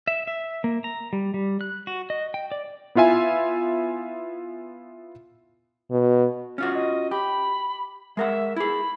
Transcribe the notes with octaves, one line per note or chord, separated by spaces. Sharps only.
E5
E5
A#3
A#5
G3
G3
F#6
F#4
D#5
G5
D5
B3 E4 F4 E5 G#5
B2
C#4 F4 F#4 F6
D#5
G4 B5
G#3 A#4 E5 F#5
E4 G#4 B5